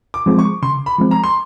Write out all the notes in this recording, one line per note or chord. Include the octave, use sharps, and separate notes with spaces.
D6
F3 G#3 C4
C#6
C#3 C6
B5
F3 G#3 C4
A#5
C6